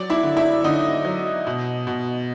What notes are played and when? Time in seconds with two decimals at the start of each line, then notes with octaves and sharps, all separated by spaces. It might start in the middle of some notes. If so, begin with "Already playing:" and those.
Already playing: F#3 D5
0.10 E4 E5
0.23 D3
0.37 E4 E5
0.64 D3 D#4 D#5
1.05 F#3
1.47 B2
1.87 B2